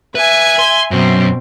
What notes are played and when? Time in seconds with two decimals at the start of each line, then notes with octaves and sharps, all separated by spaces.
0.15 B4 E5 G#5 G#6
0.59 C6
0.91 F#2 B2 C4